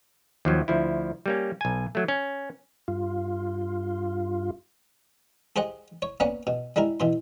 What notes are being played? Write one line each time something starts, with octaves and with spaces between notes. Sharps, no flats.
D#2 F3 F#3
D2 F3 E4
G3 A#3 C#4
B1 G#5
F#3 A3
C#4
G2 F4
G4 G#4 C5 D#5 F#5
C#5
A#3 B3 C#4 D5 F#5
B2
G3 G#3 E4 A#4
B2 E3 C6